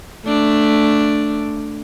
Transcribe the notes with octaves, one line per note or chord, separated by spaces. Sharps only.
A3 D4